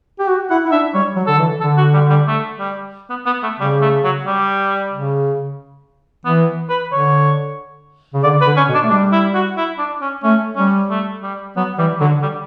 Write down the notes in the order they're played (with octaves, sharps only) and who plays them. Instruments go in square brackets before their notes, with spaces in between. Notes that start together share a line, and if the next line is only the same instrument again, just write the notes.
[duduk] G4
F#4
[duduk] E4 [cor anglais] F#5
[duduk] E4
[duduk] D4 [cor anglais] E5
[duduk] G3 [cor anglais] C#5
[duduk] F#3
[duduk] D3 [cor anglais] A4
[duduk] E3
[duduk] D3 [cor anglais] A4
[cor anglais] F#4
G3
G3
A3
G3
B3
B3
A3
[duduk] C#3 [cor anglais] G3
[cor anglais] A3
F#3
G3
[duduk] C#3
[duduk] E3 [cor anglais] B3
[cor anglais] B4
[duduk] D3 [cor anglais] C#5
[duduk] C#3
[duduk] D3 [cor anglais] D5
[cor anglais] B4
[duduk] D3
[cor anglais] C#4
[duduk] B2
[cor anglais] D4
[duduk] A3
[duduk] G3 [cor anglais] D4
[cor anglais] E4
F#4
E4
D4
C#4
[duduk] A3 [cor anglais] C#4
[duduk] G3 [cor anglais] C#4
[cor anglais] A3
G3
[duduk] F#3 [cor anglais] B3
[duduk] E3 [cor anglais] G3
[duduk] D3 [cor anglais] F#3
[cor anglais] G3